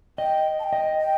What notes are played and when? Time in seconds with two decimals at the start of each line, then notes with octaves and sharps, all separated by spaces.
0.18 D#5 G5
0.59 A5
0.64 G5
0.73 D#5
1.00 G5